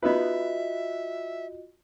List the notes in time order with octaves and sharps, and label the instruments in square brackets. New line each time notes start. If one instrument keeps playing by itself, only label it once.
[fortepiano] B3 D#4 B4 [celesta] F4 F#4 D#5 [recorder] E5